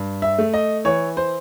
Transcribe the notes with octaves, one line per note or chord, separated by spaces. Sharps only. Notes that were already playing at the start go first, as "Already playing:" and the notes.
Already playing: G2
E5
A3
D#5
E3 C#5
C5